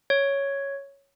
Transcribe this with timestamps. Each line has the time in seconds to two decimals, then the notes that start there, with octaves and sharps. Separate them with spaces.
0.10 C#5